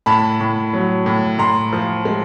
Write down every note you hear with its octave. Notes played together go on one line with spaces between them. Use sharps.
A2 A5 B5
A2
F#3
A2
A2 A#5 C6
F3
G#3